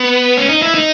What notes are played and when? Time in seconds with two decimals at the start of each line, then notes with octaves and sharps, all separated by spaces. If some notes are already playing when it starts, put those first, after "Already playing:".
Already playing: B3
0.37 C#4
0.49 D#4
0.62 E4
0.74 D#4